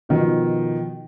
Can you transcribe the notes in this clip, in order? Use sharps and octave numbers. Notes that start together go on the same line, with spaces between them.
B2 D#3 F3